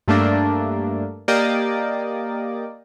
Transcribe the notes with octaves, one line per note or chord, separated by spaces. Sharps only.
G2 A3 A#3 D4
A#3 G4 D5 D#5